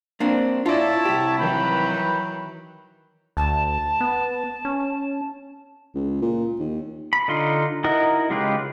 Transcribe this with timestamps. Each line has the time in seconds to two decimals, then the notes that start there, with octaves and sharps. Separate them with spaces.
0.20 A#3 C4 D4
0.66 E4 F4 C#5 D5 E5 A5
1.05 C2 G4
1.39 D#3 E3 F#3 B4 G5 B5
3.37 D2 A5
4.00 B3
4.65 C#4
5.95 C#2
6.22 A#2
6.59 D#2
7.13 B5
7.28 D3 D#4 F4 C6
7.84 D#4 E4 F#4 A#4 D#5
8.30 C#3 G#3 F4 G4 B4